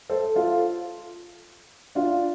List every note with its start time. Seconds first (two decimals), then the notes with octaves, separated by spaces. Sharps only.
0.09 A4 C5
0.36 F4 A4
1.95 D4 F4